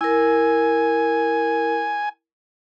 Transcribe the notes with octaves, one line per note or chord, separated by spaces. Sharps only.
E4 A#4 G#5